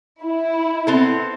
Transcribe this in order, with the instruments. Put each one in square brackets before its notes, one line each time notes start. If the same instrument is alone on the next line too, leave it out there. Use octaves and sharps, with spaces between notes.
[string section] E4
[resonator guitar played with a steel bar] B3 C4 A4